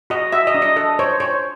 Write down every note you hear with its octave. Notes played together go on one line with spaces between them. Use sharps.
F#4 D#5
F#4 E5
D#5
D4
D#5
A4 D#5
C5 C#5
C5 C#5